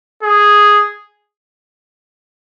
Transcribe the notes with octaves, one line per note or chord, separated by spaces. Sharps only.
G#4